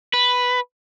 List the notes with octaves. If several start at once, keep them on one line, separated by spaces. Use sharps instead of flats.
B4